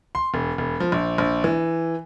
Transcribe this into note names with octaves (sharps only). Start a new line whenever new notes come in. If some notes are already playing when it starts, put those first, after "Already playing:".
C6
E1
E1
F3
A#1
A#1
E3